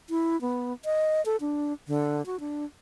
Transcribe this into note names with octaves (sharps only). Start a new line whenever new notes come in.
E4
B3
D#5
A4
D4
D3
F#4
D4